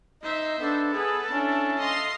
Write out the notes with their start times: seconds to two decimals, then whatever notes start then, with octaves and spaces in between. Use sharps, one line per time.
0.23 D#4 C5 E5
0.60 B3 D4 A4
0.93 G#4 B4
1.31 C#4 D4 E4
1.78 D#5 F5 C6